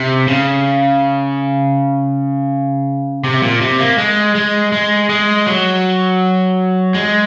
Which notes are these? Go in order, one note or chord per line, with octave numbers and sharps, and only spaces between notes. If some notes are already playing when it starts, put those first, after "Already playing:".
Already playing: C3
C#3
C3
A#2
C3
A#3
G#3
G#3
G#3
G#3
F#3
G#3